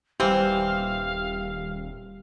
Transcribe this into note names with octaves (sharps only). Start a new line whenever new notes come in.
D#1 E3 G3 C4 G4 F5